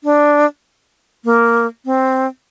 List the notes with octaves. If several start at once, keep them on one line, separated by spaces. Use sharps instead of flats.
D4
A#3
C4